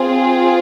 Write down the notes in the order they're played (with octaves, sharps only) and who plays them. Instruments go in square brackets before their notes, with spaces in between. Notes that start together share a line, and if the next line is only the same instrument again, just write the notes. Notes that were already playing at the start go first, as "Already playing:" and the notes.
Already playing: [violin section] C4 F4 G#4